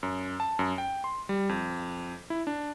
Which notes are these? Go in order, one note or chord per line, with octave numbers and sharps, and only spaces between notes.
F#2
A5
F#2
G5
C6
G3
F2
E4
D4